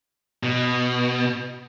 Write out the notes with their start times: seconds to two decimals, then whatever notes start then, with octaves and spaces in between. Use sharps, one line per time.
0.43 B2